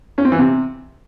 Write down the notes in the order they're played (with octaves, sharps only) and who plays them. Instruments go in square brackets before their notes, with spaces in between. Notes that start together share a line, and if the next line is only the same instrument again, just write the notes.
[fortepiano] C#4
C4
E3
C3